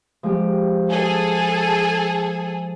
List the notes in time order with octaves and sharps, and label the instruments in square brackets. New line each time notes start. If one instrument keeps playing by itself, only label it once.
[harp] F3 G#3 G4
[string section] G#4 A4